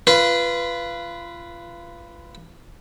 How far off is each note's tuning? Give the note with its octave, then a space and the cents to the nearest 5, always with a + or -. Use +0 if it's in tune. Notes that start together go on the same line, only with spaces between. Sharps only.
F4 -25 B4 +0